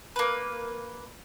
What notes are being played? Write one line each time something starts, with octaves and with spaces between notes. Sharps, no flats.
A#3 B4